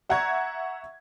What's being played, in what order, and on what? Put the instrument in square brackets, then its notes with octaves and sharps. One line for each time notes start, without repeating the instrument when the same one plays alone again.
[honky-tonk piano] E5 F#5 A#5 C#6 G#6